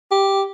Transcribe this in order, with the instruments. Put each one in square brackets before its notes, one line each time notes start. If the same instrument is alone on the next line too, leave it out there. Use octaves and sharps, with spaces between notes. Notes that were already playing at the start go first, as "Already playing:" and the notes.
[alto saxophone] G4